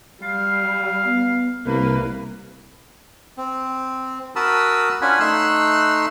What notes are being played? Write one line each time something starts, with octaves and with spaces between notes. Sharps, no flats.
G3 F5
B3
C2 A#3 B4
C4
F#4 A#4 A5 B5 D#6 E6
C#4 D4 F4 F#5 G#5 B5
A3 D#4 C6 E6 F#6